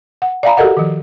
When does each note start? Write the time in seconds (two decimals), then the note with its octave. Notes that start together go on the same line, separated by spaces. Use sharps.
0.22 F#5
0.43 D5 E5 F5 G#5 A#5 B5
0.57 F#4 G4 A4 A#4 D#5 F#5
0.77 D#3 F3